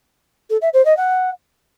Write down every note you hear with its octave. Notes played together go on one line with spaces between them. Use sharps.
A4
E5
C5
D#5
F#5